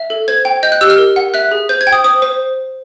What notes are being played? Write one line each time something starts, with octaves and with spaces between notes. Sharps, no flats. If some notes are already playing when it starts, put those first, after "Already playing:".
Already playing: E5
A4
C5 G#6
G5
D#5 G6
F#6
G4 E6
F6
A#4
F#5
E5 F#6
G#4
C5 G6
G#6
G5
D#6
C5 D#6
C5